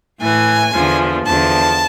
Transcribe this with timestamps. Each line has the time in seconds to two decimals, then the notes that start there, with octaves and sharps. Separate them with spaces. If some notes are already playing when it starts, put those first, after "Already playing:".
0.20 A2 E3 G#5
0.73 E2 D3 F3
1.25 E2 D3 F3 A5